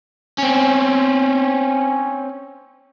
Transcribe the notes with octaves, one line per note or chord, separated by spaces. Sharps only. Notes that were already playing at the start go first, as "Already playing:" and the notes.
C4 C#4